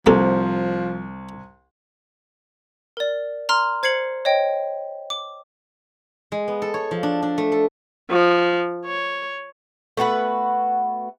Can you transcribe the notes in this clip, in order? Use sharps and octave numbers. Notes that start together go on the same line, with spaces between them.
C2 F3 A#3 G4 A4
A#4 D5
A#5 C6 F6
C5 G#6 C7 C#7 F#7
C#5 D#5 G5
D6
G#3
B3
A4
C#5
F3
D4
D4
A3
A4
F3
C#5
A3 B3 F#4 B4